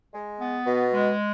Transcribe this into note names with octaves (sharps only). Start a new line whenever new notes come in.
G#3
B3
B2
G#3